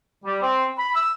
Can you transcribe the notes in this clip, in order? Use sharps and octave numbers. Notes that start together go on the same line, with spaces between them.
G3
C4
B5
E6